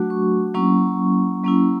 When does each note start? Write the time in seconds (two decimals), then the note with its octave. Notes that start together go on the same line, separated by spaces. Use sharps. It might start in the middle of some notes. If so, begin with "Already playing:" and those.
Already playing: F#3 A3 D4 F#4
0.10 C#6
0.54 F#3 A#3 C#4 E4 C#6
1.43 F#3 A#3 C#4 E4